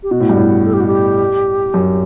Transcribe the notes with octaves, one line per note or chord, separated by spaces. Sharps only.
G4
B2 F#4
A2
G2
A2
A4
G4
F#4
G4
F#2